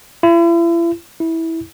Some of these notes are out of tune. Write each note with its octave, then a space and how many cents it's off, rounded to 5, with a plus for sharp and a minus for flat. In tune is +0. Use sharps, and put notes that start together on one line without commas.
E4 +40
E4 -15